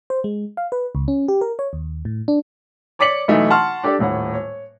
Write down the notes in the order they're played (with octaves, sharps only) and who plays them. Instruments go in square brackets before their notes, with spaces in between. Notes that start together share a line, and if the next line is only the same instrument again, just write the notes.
[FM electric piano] C5
G#3
F5
B4
C#2
C#4
G4
A#4
C#5
D#2
A2
D4
[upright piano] C#5 D5 D6 B6 C#7 F#7
B1 E3 A3 D#4
F#5 A5 C6 C#6 F6
D4 G4 A4 D5
D#1 A2 C#5 F#5
C#5